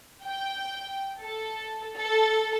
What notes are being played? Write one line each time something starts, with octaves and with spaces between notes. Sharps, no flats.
G5
A4
A4